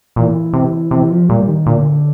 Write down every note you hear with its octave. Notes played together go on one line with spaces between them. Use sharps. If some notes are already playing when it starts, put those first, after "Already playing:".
A#2 E3
C3
C3 E3
F3
A#2 G3
D#3
A#2 D3